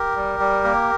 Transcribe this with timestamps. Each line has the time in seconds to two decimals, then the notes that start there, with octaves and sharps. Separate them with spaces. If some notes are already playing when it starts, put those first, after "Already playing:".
Already playing: G4 A#4
0.16 G3
0.40 G3
0.64 A#3